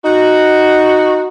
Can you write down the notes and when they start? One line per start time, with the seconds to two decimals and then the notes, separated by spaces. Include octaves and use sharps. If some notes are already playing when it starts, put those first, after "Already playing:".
0.05 D#4 F#4